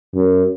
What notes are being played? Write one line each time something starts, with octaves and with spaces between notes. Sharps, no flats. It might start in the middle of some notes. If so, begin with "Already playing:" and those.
F#2